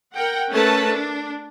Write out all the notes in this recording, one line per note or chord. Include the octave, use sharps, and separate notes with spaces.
A#4 F#5 G5
A3 C#4 A#4 B4 A5
D4